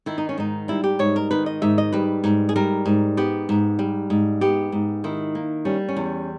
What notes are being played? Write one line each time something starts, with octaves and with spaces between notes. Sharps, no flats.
D#3 E4
D#4
C#4
G#2 D#4
G3 E4
G4
G#2 C#5
A#4
D#3 B4
D#5
G#2 E5
D#5
G3 B4
G#2
G#4
G3 A#4
G#2
B3 G4
G#2
G3
G#2
B3 G4
G#2
D#3 E4
A#3
G3 C#4
C#4
E2